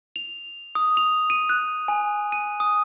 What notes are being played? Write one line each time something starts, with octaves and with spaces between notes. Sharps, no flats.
F7
D#6
F7
D#7
F#6
G#5
D#7
D#6